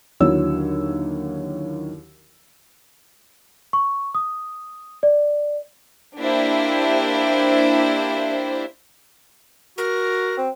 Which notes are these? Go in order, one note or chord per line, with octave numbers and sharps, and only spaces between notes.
D#2 D3 F#3 E4 C#5 E6
C#6
D#6
D5
A#3 D4 E4 G4 C5
F#4 A#4
C4